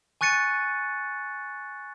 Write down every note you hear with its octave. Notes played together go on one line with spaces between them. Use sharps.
G#5 C#6 F#6 A6 C#7 D#7